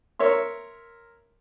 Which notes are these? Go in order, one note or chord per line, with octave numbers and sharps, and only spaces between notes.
A#4 C#5 E5 C6